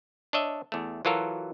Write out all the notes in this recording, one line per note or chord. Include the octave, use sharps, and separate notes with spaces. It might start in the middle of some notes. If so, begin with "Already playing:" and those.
D4 C#5 D#5 E5
E2 A3
E3 F#3 F4 F#4 A4 A#4